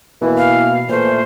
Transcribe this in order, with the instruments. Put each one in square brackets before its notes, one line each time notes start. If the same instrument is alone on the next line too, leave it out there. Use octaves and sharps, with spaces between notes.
[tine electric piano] B2 A#3 [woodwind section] E3
[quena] F5
[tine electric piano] A#2 A3 [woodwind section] E3 [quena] C5